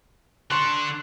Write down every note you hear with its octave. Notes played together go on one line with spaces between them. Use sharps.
D3 D4 C6 C#6 F#6